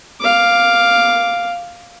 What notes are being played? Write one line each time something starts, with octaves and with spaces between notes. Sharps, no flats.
F5 D6